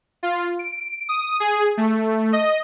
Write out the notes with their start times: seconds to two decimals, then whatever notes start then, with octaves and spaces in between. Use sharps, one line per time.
0.23 F4
0.59 D7
1.09 D#6
1.40 G#4
1.77 A3
2.33 D#5